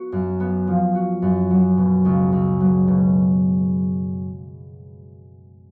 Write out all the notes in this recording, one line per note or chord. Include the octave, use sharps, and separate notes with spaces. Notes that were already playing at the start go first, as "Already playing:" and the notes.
Already playing: B3 F#4
F#2
B3
F3
F#4
F#2
F#3
B2
C#2
C#2
F#3
B2